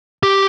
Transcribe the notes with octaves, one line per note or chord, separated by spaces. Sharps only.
G4